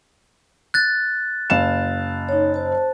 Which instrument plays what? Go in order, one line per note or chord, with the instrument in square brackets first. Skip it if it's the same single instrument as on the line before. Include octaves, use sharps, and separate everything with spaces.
[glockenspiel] F#6 A6
[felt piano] F#1 F5 E7
[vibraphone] D#4 C#5
C5 A5